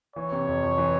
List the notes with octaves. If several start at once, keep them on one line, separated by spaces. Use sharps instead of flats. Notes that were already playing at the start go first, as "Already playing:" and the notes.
E3 C#5
C3
F2
F2
E3